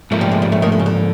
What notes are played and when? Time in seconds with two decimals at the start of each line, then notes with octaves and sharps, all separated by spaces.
0.11 G#2 F3 A3 A#3
0.21 G3
0.32 G#3
0.42 G3
0.52 A3
0.62 D#3
0.72 D3
0.79 C#3
0.86 D3